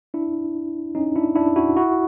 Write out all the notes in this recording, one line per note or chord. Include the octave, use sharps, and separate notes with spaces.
D4 E4
C#4 D#4
D4 E4
D4 E4
E4 F#4
E4 F#4